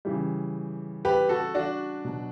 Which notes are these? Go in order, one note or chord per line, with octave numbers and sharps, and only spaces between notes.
C#3 E3 G3
G4 B4
F#4 A4
D4 F#4
B2 F#3